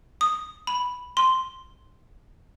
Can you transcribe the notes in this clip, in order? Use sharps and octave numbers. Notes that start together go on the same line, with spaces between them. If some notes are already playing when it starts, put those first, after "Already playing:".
D#6
B5
C6